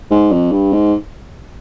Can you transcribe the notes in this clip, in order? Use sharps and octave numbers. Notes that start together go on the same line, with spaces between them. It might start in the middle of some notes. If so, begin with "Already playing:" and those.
G#2
F2
G2
G#2